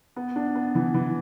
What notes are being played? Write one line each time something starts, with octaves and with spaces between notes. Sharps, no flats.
B3
D4
B3
E3
E3